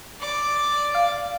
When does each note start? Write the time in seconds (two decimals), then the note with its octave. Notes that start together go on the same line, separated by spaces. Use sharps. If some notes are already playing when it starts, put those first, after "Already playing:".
0.20 D5 D6
0.95 F5